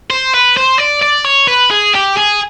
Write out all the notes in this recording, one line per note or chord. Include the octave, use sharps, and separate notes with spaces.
C5
B4
C5
D5
D5
C#5
B4
G#4
G4
G#4